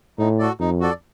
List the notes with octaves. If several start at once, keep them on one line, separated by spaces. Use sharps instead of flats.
A2 D#4
F#4 A4 D5
F2 D#4
F#4 A4 D5